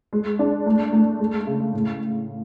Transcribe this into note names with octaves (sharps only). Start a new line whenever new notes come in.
G#3
D4
A3
A3
G#3
C#3
A2